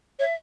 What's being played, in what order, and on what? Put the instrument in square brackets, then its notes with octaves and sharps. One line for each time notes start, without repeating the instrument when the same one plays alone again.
[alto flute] C#5 [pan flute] E5